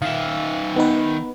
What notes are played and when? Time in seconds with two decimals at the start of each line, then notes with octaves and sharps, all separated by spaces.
0.02 D#3 E5 F5
0.76 B3 D#4 B4